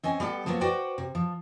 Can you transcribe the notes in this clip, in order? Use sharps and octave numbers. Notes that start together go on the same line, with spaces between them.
C4 C#4 D#5 G#5
G3 B3 G4 A4
F3 F#3 A#3 B3 F4
F#4 B4 C5 D5 G5
C3
F3